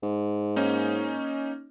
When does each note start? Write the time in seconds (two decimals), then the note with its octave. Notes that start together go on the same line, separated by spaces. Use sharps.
0.03 G#2
0.56 A#3 C#4 D#4